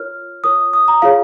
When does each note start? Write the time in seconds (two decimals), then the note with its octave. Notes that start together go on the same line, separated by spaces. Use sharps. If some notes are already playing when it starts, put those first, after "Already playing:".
Already playing: F4 A#4 C#5 F6
0.44 F4 A#4 C#5 D#6
0.73 D#6
0.88 A#5
1.02 F4 G#4 C#5 F5